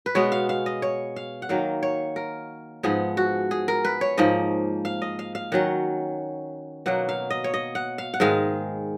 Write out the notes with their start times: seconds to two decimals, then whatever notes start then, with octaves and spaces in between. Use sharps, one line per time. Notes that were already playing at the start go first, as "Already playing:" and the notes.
0.06 B4
0.15 B2 G#3 B3 C#5
0.32 F5
0.49 F5
0.66 D#5
0.82 C#5
1.16 F5
1.42 F#5
1.49 D#3 F#3 A#3 F5
1.83 C#5
2.16 A#4
2.83 G#2 F3 B3 G#4
3.17 F#4
3.51 G#4
3.68 A#4
3.85 B4
4.01 C#5
4.18 G#2 F3 A#3 D#5
4.85 F5
5.02 D#5
5.19 F5
5.35 F5
5.52 D#3 F#3 C#4 F#5
6.86 B2 F#3 A#3 F#5
7.09 F5
7.30 D#5
7.44 C#5
7.54 D#5
7.75 F#5
7.98 F5
8.14 F#5
8.20 G#2 D#3 G#3 F5